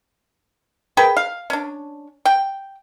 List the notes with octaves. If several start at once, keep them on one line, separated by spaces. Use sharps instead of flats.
G#4 A#4 B4 G5
F5
C#4 D4
G5